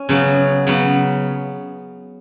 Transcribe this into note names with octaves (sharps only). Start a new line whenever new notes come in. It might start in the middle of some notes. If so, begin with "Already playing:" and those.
Already playing: C#4
C#3 F#3 B3
C#3 F#3 B3